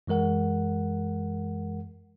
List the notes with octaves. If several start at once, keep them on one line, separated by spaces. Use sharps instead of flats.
F#2 E3 G#3 A#4 F#5